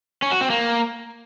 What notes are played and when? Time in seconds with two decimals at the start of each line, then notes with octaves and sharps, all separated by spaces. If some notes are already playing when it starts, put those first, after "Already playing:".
0.22 C#4
0.32 F#4
0.41 C4
0.50 A#3